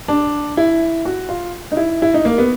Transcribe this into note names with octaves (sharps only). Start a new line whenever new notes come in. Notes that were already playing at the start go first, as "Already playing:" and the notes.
D4
E4
F#4
F4
D#4
E4
E4
D#4
A#3
B3